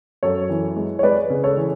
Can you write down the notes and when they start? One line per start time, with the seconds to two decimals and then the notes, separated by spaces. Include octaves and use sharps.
0.23 F#2 A4 C#5
0.50 E3
0.76 G#3
0.99 C#5
1.03 G#3 B4 D5
1.30 C#3
1.44 A4 C#5
1.57 E3